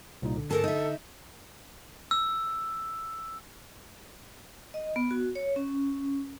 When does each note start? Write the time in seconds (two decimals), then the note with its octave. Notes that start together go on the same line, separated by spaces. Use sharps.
0.22 C2 A#2 D#4
0.37 D3
0.50 G#2 A4 A#4 A5
0.64 D#4 E5
2.11 E6
4.74 D#5
4.96 B3
5.11 F#4
5.35 C#5
5.56 C#4